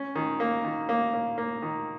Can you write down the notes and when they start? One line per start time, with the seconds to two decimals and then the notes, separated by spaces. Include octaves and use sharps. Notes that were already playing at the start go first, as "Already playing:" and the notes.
Already playing: C#4
0.15 D#3
0.40 A#3
0.64 D#3
0.89 A#3
1.14 A#3
1.38 A#3
1.62 D#3